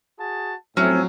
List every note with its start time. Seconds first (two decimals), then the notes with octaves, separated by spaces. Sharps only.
0.18 F#4 G#4 A5
0.77 A2 F3 F#3 C4 C#4 A4 E5